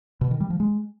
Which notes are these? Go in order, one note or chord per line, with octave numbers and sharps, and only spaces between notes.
B2
D#3
G3
F3
G#3